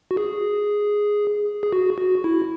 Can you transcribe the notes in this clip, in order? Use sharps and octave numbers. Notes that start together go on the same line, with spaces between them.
F#4
G#4
G#4
F#4
F#4
E4